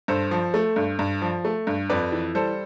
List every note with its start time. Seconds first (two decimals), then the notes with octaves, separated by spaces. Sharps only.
0.08 G2 A4 C5
0.31 F3
0.54 A3
0.76 G2
0.99 G2
1.22 F3
1.45 A3
1.67 G2
1.90 F2 B4 D5
2.12 E3
2.35 G3 A4 C5